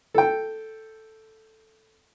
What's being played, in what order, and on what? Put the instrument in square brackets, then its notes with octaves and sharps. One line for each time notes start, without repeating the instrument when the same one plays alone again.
[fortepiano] A4 G5